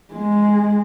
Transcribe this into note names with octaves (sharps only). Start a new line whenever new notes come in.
G#3